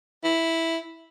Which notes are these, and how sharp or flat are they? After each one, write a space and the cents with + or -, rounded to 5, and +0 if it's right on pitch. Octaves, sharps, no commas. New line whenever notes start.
E4 -5